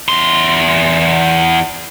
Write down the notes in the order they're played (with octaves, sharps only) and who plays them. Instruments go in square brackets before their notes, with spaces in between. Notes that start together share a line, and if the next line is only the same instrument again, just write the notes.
[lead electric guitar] E2 C6